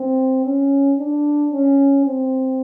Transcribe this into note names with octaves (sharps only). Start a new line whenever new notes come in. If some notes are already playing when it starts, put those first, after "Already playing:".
Already playing: C4
C#4
D4
C#4
C4